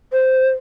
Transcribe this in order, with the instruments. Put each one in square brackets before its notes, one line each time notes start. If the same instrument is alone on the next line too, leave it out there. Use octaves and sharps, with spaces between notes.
[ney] C5